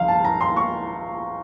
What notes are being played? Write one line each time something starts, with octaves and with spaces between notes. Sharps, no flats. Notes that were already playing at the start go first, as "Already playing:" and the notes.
Already playing: C#2 F3 F5
A5
A#5
C6
C#6